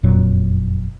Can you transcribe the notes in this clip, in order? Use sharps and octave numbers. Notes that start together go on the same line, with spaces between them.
F#1 F2 A#2 F#3